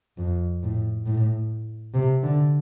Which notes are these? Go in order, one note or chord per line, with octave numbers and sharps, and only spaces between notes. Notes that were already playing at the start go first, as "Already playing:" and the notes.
F2
A2
A2
C3
D3